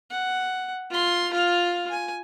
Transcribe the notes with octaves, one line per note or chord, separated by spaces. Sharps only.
F#5
F4 C6
F4 F5
G#5